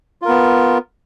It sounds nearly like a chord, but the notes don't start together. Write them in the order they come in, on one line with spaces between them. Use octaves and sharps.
F4 A#4 B3